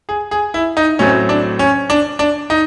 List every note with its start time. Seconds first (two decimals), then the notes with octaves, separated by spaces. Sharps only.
0.09 G#4
0.31 G#4
0.54 E4
0.77 D#4
0.99 A2 F#3 A3 C4 C#4
1.29 D4
1.59 C#4
1.90 D4
2.19 D4
2.50 D#4